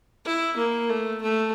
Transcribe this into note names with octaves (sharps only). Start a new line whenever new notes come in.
E4
A#3
A3
A3